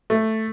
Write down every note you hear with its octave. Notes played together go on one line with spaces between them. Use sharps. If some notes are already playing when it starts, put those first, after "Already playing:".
A3